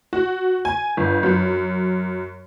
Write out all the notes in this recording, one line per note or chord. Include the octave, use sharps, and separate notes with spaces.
F#4
G#5
G1
F#2